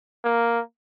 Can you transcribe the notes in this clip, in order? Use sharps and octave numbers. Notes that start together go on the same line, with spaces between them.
A#3